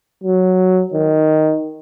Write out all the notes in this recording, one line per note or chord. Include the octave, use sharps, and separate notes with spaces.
F#3
D#3